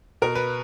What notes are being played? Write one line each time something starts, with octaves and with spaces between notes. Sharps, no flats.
B2 A#4
B4